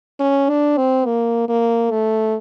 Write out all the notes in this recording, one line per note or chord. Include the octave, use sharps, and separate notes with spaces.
C#4
D4
C4
A#3
A#3
A3